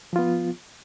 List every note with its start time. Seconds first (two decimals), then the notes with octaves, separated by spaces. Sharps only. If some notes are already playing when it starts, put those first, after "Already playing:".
0.13 F3
0.16 F4
0.19 B3